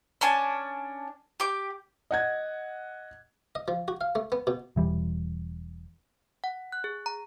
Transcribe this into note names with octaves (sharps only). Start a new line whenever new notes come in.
C#4 D4 G#5 A5
G4 D6
D#5 F#5 G#6
D#5
F3
F#4
F5
A3
B3
B2
E1 E3 G3
F#5
F#6
G#4
A#5